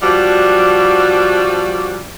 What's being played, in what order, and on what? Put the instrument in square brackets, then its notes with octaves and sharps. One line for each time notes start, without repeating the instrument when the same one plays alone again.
[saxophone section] F3 G3 D4 F#4